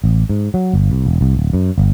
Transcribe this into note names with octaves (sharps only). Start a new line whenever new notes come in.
A1
G#2
F#3
G1
C2
E1
C2
D1
F#2
G1